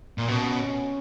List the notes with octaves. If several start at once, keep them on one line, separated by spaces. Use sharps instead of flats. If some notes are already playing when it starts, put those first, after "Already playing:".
A#2
B2 C#4